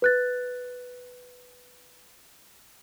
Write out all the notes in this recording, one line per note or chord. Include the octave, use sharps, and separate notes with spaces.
B4 F#6 A6